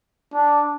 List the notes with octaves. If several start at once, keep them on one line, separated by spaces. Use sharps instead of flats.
D4